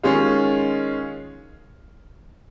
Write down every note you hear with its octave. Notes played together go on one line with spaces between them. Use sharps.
D#3 G#3 C#4 F4 G#4